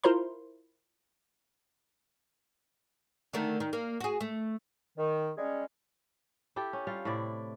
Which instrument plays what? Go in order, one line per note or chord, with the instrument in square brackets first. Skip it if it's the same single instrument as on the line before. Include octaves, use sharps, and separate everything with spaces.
[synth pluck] E4 F4 A#4 C5 A#5 C6
[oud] D3 D#3 A3
D#3
A#3
F#4 G#4
A3
[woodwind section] D#3
G3 G#3 C#4 G#4
[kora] E4 G4 A4 G5
C#4
G3 F4 A4 F5
A2 C3 E4 D5